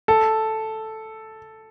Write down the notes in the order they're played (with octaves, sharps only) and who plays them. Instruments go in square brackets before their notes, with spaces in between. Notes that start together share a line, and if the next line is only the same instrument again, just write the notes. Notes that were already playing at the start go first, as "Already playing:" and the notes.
[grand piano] A4